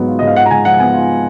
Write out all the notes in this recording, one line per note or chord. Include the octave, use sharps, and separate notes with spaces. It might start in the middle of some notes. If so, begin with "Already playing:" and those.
Already playing: G#2 F#3 B3
F4
G#2 D#5
F5
F4 F#5
A#5
G#2 G#5
F3 F#5
B3 G#5
F4